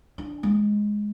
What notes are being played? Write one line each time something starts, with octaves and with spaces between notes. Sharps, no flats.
D4
G#3